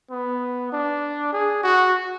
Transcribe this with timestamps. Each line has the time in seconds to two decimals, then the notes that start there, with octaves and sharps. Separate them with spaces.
0.11 B3
0.72 D4
1.33 G#4
1.63 F#4